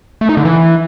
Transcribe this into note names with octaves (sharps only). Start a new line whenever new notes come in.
A3
D#4
D3
E3